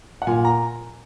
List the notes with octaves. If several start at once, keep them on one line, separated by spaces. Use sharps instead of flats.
F#5
A#2 G#5
A#5